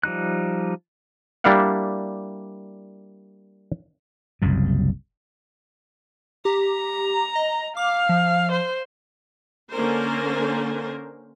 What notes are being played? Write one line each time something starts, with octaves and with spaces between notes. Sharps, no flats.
F3 G3 D#4 F#6
G3 A#3 D4 E4 F5 F#5
F#1 C2 F#2
G4 A#5
D#5
F5 D6
F3
C5
D3 A#3 C#4 A#4 C5